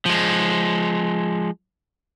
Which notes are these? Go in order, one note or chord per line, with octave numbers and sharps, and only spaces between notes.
F3 G#3